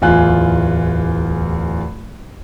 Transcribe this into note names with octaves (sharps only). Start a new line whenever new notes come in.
D1 E2 F4 G#5 F#6